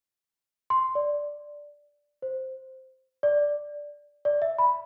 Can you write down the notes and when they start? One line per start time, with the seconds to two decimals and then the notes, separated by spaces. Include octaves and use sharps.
0.70 C6
0.95 D5
2.22 C5
3.23 D5
4.25 D5
4.42 E5
4.58 B5